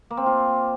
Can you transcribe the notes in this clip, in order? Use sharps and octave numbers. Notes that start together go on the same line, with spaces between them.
A#3
C4
F4